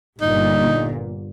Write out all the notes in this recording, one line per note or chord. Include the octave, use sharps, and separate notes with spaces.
G1 A#2 D#4